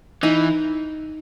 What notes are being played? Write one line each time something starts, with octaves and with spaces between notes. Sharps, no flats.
E3 D#4